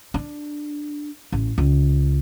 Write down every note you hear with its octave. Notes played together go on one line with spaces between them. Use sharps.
D4
A1
C#2